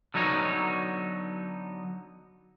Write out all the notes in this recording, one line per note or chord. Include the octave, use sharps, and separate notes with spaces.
D3 F#3 B3 D#4 C#5